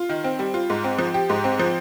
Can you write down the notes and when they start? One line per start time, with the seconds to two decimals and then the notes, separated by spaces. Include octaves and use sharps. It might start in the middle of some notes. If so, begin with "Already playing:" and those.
Already playing: F4
0.09 D#3
0.24 C4
0.39 G3
0.54 F4
0.70 G#2
0.84 C4
0.99 F3
1.14 G4
1.30 G#2
1.44 C4
1.59 F3